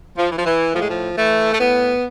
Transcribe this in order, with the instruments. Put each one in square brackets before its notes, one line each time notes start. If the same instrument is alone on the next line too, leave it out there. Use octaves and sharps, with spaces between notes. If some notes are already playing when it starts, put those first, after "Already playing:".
[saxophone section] F3
E3
F3
E3
A2 F3
G#3
F3
E3 A3
A3
A2 B3